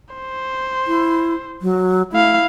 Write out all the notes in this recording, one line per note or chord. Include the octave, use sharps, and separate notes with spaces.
C5
E4
F#3
A3 E4 F5